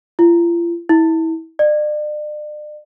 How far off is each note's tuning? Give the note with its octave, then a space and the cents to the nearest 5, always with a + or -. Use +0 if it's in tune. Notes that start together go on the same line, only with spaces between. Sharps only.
F4 -40
E4 -25
D5 +40